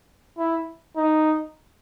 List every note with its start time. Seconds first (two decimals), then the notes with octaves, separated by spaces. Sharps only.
0.38 E4
0.96 D#4